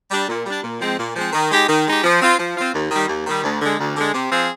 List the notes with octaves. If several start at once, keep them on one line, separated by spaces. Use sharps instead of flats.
G3 D4
A#2
G3 D4
A#2
F3 G#3 C4
A#2
F3 G#3 C4
D#3
G#3 D#4 G4
D#3
G#3 D#4 G4
F3
C4 F4
F3
C4 F4
D#2
D#3 G3
D#2
D#3 G3
D2
D3 G#3
D2
D3 G#3
C3
F3 C4 F4 G#4